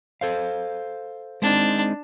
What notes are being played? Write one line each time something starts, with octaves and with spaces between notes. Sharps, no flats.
A4 C5 F5
G#3 C4 D4 D#4